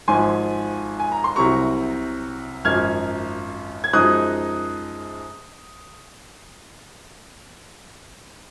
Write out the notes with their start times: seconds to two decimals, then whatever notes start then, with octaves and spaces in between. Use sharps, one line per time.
0.08 G#1 G#2 F3 G#5 C6
1.00 G#5
1.12 A#5
1.24 C6
1.36 C2 C3 F#3 A#5 C#6
2.65 G#1 F#2 F3 F6 G#6
3.84 G#6
3.93 F#2 F3 G#3 D#4 D#6 F#6